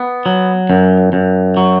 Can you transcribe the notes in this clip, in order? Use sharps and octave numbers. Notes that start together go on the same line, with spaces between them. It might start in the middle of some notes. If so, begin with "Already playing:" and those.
Already playing: B3
F#3
F#2
F#2
F#3